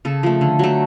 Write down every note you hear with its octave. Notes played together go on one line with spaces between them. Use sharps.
C#3 A4
F3 A3
D3
F#3 A3